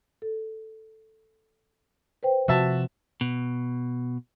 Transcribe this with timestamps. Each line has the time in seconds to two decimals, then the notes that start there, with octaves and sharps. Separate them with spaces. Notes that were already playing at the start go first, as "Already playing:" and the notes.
0.22 A4
2.23 B4 C5 G5
2.48 C3 F3 F#4 E5 A5
3.21 B2